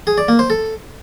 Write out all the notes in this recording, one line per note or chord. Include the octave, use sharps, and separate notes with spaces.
G#4
D5
A#3
C5
A4